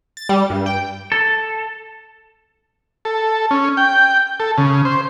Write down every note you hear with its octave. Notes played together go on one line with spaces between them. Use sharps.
A6
G3
G2
G5
A4
A4
C#4
G5
A4
C#3
C5